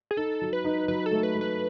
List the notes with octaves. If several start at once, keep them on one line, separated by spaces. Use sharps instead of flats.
G#4
D#4 A4
F#3
B4
D#4
F#3 B4
A4
A3
B4
A3
B4